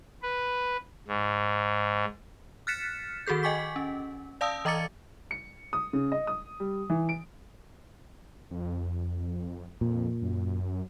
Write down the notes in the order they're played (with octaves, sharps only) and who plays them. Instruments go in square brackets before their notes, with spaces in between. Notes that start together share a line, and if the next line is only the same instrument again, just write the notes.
[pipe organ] B4
G#2
[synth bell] F6 F#6 A6 B6 C#7 E7
D#3 F#4 G#4 A4 G6
D#5 G5 G#5 C#6 D6 B6
C#4
D5 F5 A5 D#6 E6
E3 D#5 A#5 D6 A6 C#7
[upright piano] C#7
D#6
C#3
D#5
D#6
G3
E3
D7
[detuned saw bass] F2
[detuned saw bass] F2 [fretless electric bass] A#2
[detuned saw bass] F#2